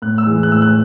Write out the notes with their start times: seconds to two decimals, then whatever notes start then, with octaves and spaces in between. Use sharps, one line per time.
0.02 A2 F#6
0.18 E6
0.26 E3 G#3
0.43 F#6
0.49 A2 E6
0.62 F#6